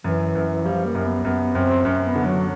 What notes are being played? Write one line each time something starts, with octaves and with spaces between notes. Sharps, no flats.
F#2 E3
F#2
F3 G3
A#3
F#2
B3
F#2 B3
F#2 C4
F#2 C#4
B3
D3
F#3